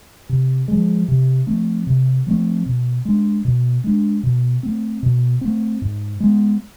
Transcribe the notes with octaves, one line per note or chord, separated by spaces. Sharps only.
C3
F3 G#3
C3
F3 A3 C4
C3
F3 A3 C4
B2
G#3 D4
B2
G#3 D4
B2
A3 C4
B2
A3 C4
G#2
G#3 B3